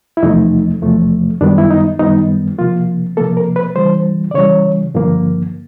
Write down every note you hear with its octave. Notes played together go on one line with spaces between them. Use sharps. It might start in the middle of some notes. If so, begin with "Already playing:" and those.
E4
E2 C3 F3 A3 D#4
E2 C3 F3 A3
F#2 D#3 G3 B3 D4
E4
D#4
F#2 D#3 G3 B3 D#4
C3 F3 A#3 F4
C3 F3 A#3 A4
A#4
B4
C#3 E3 G3 C5
D5
C#3 E3 G3 C#5
G2 D3 F3 A#3